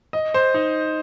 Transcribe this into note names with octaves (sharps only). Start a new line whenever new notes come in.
D#5
C5
D#4